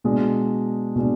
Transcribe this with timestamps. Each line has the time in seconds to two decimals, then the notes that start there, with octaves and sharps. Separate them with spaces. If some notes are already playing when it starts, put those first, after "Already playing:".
0.04 B2 G#3 D4
0.96 B2 G#3 D4